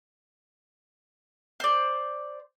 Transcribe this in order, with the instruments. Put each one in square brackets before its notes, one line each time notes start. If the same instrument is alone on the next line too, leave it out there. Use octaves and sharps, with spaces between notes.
[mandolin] C5 D5